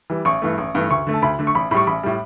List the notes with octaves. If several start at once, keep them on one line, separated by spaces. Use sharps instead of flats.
E3 G3
A1 C#6
G2 E3 A3
A1
G2 E3 A3
D2 C#6
D3 A3
A5
D2 B5
D3 A3
C#6
A1 B5
A2 G3 B5 C#6
A1 B5
A2 G3